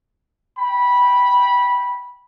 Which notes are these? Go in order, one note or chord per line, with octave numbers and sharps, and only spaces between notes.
G5 B5